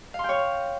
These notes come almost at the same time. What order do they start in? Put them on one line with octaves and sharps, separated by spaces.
F5 C6 G5 C#5